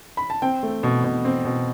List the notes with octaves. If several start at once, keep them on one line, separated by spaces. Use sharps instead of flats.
B5
A5
C4 G5
A3
B2
B2
C4
B2